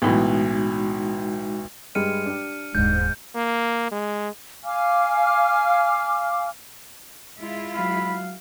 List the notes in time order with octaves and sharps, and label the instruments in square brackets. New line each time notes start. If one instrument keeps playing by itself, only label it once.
[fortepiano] B1 A2 E3 [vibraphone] G#3 D#4 F#4
[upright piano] G2 G3 G#3 [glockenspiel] F6 C#7 D#7
[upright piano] D4 G4
[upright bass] D#1 D#2 [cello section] G#2 [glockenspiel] G6
[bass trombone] A#3
G#3
[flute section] F5 G#5 D6 F6
[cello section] G#3 E4 F4
[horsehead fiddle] F#3 F5 [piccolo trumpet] B5